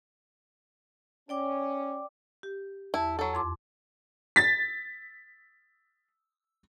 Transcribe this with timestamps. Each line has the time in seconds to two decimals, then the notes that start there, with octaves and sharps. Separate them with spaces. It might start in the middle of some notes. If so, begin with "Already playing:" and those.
1.29 C#4 D5 G5 D6
2.43 G4
2.94 E2 E4 A5
3.19 F#3 A4
3.34 F2 C6 D6
4.36 A6 B6